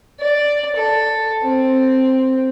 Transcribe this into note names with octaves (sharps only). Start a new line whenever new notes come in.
D5
A4
C4